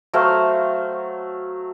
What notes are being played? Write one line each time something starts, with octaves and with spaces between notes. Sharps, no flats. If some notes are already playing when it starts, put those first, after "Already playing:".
F#3 A3 C5 F5